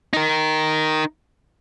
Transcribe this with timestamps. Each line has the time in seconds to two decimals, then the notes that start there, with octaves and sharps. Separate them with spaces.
0.13 D#4 A#4